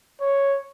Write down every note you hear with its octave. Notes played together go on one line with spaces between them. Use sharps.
C#5